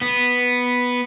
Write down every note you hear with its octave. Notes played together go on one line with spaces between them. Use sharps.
B3